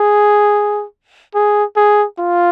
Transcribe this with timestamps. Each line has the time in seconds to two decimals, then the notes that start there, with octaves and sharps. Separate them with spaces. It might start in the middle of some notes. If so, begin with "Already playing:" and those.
Already playing: G#4
1.35 G#4
1.76 G#4
2.19 F4